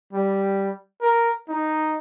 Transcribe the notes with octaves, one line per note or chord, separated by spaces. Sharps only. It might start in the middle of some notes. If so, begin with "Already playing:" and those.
G3
A#4
D#4